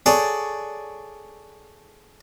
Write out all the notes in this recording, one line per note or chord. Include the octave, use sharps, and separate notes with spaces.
G#4 A4 C#5 D5 F#5